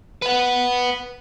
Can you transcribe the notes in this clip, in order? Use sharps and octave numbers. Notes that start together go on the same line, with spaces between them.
B4 F#5